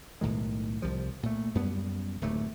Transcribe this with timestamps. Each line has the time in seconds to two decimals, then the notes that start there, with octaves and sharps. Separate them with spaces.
0.21 B1 A2 D#3 G#3
0.82 C2 C3 F3
1.23 A#2 A3
1.55 F#2 G3 B3
2.21 D1 D#2 A#2 A3